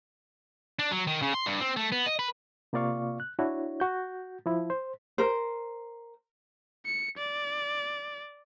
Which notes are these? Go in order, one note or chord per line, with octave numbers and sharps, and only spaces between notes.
D4
F#3
D#3
C#3
C6
G2
C4
A3
B3
D#5
B4
C3 A#3 F4 D5 F5 C#6
F#6
D4 E4 F#4 C#5
F#4 G6
F3 E4
C5
A#4 C5
C#7
D5